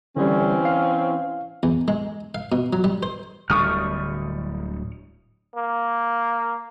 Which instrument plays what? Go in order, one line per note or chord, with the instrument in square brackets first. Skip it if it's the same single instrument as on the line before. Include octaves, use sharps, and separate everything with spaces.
[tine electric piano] D3 G3 [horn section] E3 C4 C#4
[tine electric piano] F5
[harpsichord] E2
G#3
F5
B2
F#3
G3
C5
[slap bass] D1 D3 G3 [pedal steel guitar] C#6 D#6 F6
[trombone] A#3